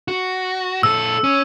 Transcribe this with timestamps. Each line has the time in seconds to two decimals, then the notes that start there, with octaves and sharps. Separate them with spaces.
0.08 F#4
0.83 A#2 A4 E6
1.24 C#4